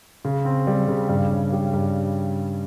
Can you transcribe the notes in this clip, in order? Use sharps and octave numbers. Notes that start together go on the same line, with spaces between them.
C#3
C4
G3
C#3
G2
C#4
G3
G2